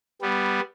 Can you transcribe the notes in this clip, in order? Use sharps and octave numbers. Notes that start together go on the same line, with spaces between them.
G3 B3